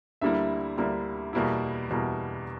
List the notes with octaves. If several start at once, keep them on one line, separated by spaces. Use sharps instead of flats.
D2 D3 G3 A#3 E4 E5
D2 D3 G3 A#3 E4
E2 B2 G3 A#3 E4
E2 B2 G3 A#3 E4